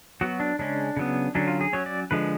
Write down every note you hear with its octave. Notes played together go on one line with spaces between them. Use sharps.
F#3 B3 F#4
D4
C#3 G#3 C#4 D4
C#3 F#3 B3
D3 F#3 C#4 D4
F4
G#4
F#3 C#4 C#5
D5
D3 F3 G#3 B4